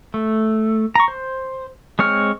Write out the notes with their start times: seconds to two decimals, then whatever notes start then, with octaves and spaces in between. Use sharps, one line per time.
0.14 A3
0.96 A#5 C#6
1.08 C5
1.99 G#3 C4 C#5 F6